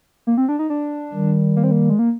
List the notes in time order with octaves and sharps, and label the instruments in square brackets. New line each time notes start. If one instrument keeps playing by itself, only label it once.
[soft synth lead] A#3
C4
D4
D#4
D4
[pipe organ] D#3 G3
[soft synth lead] A#3
C4
A#3
G#3
A#3